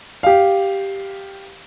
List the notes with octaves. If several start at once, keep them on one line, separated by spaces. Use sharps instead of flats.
G4 F5